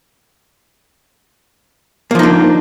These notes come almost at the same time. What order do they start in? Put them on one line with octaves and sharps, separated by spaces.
A#3 F3 D#4 D4